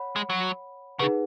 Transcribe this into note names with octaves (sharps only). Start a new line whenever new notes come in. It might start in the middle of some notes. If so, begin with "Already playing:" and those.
Already playing: C#5 F#5 B5
G#3
F#3
C#3 D#4 G#4 B4 F#5